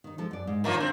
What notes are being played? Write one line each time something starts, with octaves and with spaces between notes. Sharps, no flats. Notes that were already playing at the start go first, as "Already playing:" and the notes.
D#3 D#4
F3 G#3 A4
F#2 D5
G#2
D#3 F3 A#3 C#4
C4 D4 F4 A4